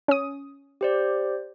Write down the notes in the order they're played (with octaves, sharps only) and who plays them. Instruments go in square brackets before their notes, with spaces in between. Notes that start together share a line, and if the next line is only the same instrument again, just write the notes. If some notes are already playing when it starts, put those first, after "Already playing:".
[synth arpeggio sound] C#4 D#6
[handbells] G4 C5 D5